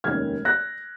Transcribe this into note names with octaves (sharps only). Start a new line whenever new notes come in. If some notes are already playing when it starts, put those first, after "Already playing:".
F1 D#2 D#3 G#3 C#4 F6 G#6
F#6 A#6